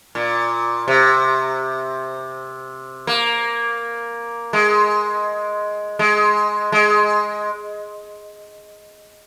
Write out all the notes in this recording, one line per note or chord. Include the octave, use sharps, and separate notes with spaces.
A#2
C3
A#3
G#3
G#3
G#3